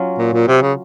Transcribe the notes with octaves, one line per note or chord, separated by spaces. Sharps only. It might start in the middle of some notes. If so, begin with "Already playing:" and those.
Already playing: F#3 C#4 F4
A#2
A#2
C3
C#3